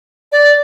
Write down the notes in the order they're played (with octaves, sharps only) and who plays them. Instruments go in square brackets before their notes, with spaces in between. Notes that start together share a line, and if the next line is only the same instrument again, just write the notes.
[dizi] D5